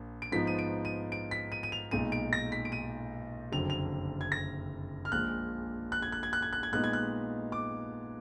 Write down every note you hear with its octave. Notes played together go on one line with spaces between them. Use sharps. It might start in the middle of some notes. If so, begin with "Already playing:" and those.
Already playing: A#1 A#2 A#3
D7
G#2 F3 B3 D#4 B6
D#7
D7
D#7
D7
B6
D#7
D#7
F7
B1 A#2 G#3 D#4 D#7
D7
A#6
B6
D7
D#7
F#1 F2 D3 F#3 F7
F7
G#6
A#6
F6
A#1 A#2 G#3 F#6
F#6
G#6
F#6
G#6
F#6
G#6
F#6
G#6
A#2 G#3 B3 D#4 F#6
G#6
F#6
D6